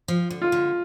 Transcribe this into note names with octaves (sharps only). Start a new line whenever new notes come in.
F3
D3
F4
D3